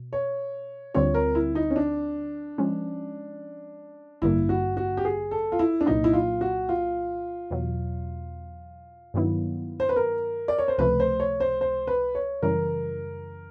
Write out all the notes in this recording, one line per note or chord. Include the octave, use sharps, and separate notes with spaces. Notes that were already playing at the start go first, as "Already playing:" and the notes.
Already playing: B2
C#5
D2 D3 G3 C4 F4 C#5
A#4
E4
D#4
C#4
D4
F3 G#3 C#4
A1 G2 D3 G3 A#3 E4
F#4
F#4
G4
G#4
A4
F4
E4
D4
C2 A#2 F#3 A#3 D#4
E4
F4
F#4
F4
E2 B2 F#3
G2 D#3 F#3 B3 E4
C5
B4
A#4
D5
C#5
C5
C#2 C3 F3 A3 B4
C5
C#5
C5
C5
B4
C#5
F#2 C#3 E3 G3 A#4